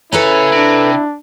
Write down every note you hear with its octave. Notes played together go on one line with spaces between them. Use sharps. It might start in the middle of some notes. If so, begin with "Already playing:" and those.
C#4 E4 G#4 A4 B4 A#5
C3 D4